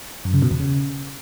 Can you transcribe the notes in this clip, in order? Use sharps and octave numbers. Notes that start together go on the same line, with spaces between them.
F#2
C#3
B2
E2
C#3